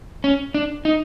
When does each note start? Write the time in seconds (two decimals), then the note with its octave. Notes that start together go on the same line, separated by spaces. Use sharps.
0.24 C#4
0.54 D4
0.85 D#4